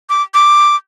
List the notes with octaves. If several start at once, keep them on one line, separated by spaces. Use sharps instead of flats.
D6
D6